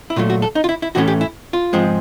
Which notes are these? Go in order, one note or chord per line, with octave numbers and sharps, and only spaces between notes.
E4
A#2 F#3 A3 F4
F#4
A4
D#4
F4
E4
E4
A2 E3 A3 C#4 F#4
G4
E4
F4
G#2 F3 G#3 C4